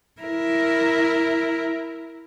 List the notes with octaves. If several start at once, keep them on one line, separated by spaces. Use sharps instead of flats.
E4 A#4